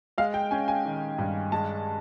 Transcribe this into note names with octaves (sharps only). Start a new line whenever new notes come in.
G#3 F5
G5
C#4 G#5
G#5
D#3
G2
G#3 A5